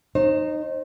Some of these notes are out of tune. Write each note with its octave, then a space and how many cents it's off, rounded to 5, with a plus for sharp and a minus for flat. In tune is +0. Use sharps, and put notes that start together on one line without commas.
D#4 -15 C5 +35